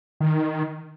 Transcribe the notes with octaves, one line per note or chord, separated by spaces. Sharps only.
D#3